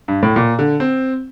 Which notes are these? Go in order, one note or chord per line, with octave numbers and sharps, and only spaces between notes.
G2
A2
A#2
D3
C4